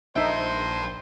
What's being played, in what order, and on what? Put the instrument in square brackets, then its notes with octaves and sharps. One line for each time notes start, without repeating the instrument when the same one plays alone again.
[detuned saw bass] A#1 [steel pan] D#4 E5 [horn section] C5 [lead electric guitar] G5 A5